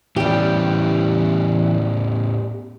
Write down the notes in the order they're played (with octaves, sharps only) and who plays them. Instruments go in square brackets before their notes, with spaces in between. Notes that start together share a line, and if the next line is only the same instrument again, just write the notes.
[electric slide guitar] A2 B3 C#4 [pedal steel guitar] E3 G5 [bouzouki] G3 G4